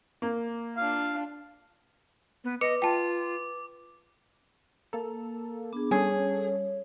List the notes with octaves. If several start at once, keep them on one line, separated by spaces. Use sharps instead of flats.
A#3
D4 F4 F5
B3
B4 D#5 D6 C#7
F4 G5 A5
A#3 A4 A#5
B3 D4 G#4 D6
G3 C#4 G#4 A4 C#5